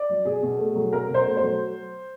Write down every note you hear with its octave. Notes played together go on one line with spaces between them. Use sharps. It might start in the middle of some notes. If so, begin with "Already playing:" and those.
Already playing: D5
F#3
B2 G#4
B2
A3
F#3
B2 A#4
B2 C5
A3
C5
F#3